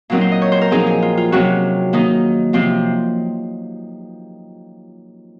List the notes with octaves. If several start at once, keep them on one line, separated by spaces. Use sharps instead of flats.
A#2 F#3 C4 D#4 A#4
C5
D#5
C#5
C5
A#4
A#2 F3 C4 D#4 G#4
G#4
F4
F4
C3 F#3 C#4 F4 F#4
D#3 A#3 D#4
C3 F3 C4 C5